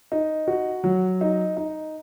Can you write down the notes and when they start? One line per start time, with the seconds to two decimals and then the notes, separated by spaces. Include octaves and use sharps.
0.12 D#4
0.48 F#4
0.84 F#3
1.21 D#4
1.57 D#4